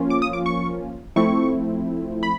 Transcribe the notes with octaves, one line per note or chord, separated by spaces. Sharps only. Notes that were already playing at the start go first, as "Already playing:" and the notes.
Already playing: F3 A#3 C#4 F4
D6
D#6
D6
C#6
F3 A3 C4 E4 C#6
B5